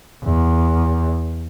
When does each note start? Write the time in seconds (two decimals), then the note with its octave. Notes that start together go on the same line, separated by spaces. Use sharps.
0.25 E2